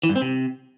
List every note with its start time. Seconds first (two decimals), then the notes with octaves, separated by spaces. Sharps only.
0.03 E3
0.10 G2
0.16 C4
0.22 C3